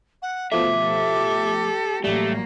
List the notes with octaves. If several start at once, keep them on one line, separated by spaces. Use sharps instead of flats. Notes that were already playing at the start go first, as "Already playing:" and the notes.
F#5
B2 F3 A3 E5 D6
G4 A4
A1 F#3 G3 A3 A#3 G4